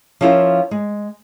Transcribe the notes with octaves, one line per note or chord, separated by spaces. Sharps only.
F3 C#4 E4 F4 A#4 C5
G#3